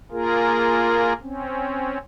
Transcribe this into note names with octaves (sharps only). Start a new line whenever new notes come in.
A#3 F4 G#4 A#4
C4 C#4